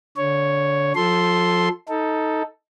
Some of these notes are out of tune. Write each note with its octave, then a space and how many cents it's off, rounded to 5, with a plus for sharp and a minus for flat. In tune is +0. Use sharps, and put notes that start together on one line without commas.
D3 -20 C#5 +0
F3 +25 A4 -5 C6 +0
D#4 +15 A4 +5